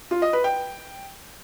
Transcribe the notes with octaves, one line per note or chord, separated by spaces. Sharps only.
F4
D#5
B4
G5